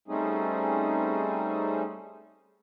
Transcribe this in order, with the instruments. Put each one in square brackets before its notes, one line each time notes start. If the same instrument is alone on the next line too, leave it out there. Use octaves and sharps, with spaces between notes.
[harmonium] G3 A3 C4 C#4 D#4 G#4